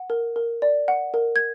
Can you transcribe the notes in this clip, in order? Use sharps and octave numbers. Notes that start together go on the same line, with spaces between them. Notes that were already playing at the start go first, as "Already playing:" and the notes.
Already playing: F#5
A#4
A#4
D5
F#5
A#4
G#6